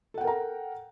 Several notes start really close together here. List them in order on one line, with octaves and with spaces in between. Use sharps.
A4 F#5 G5 A#4 A#5